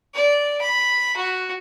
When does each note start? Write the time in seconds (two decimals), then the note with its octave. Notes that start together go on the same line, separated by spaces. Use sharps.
0.15 D5
0.61 B5
1.16 F#4